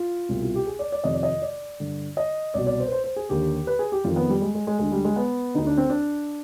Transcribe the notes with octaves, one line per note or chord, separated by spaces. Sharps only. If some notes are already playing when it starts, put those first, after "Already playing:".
Already playing: F4
C2 B2
F4
G4
G#4
D5
D5
F2 C3 D#3 D#5
D5
D#5
D5
G2 D3
D#5
C2 B2 D5
D5
C5
B4
C5
C5
G#4
D#2 D3 G4
B4
G#4
G4
F2 D#3 F4
B3
G3
G#3
G#3
G#3
D2 D3 G#3
G3
G#3
B3
D2 D3 D#4
D4
C4
D4